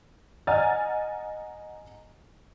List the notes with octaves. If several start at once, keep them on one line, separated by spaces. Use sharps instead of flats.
D#5 F#5 G#5 A#5 F6 A6